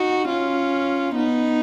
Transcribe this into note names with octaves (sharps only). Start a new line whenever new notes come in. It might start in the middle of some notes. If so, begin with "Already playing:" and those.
Already playing: D#4 F#4
C#4 F4
B3 D#4